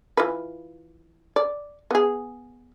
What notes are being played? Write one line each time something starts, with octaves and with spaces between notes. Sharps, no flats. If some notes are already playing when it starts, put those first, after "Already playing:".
E3 F4 B4
D5
B3 G#4